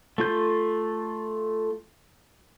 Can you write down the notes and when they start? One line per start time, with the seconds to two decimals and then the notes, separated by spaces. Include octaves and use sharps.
0.18 A3 F4 G6